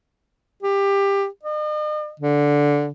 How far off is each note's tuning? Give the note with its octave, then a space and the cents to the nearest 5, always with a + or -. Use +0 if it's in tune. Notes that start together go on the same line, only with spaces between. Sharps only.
G4 +20
D#5 -45
D3 -10